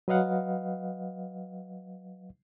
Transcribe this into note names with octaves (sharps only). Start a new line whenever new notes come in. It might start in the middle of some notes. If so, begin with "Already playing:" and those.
F#3 B4 D#5 F5 F#5